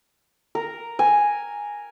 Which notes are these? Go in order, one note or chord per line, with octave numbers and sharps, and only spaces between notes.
A#4
G#5